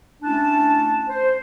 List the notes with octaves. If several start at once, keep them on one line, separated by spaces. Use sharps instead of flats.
A3 C#4 D4 E4 A5
C5